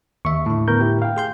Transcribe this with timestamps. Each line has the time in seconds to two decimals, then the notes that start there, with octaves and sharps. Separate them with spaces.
0.25 D#2 E5 C#6
0.46 A2 D3
0.68 B3 A#4 G6
0.80 E4 G4
1.02 F5 G5
1.17 G#4 C6 G6